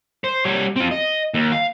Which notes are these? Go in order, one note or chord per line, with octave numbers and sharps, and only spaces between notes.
C5
G3 C#5
C4 F4
D#5
D#2
F5